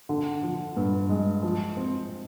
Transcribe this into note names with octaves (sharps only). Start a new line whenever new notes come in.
D3
F3
G2
G#3
F3
C4